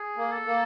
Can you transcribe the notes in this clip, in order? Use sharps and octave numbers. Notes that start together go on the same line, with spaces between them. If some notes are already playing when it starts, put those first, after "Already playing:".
Already playing: G#4
A#3
A4
A#3